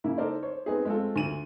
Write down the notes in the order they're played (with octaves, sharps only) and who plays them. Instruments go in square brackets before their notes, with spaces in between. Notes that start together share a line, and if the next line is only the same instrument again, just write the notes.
[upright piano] C#3 A#3 E4
D#4 A4 A#4 C5 D5
C5 C#5
B3 C4 D#4 G#4
G#3 A3 C4 F4 A4
D2 D#7 F#7